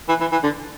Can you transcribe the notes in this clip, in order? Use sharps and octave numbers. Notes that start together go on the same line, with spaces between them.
E3
E3
E3
D3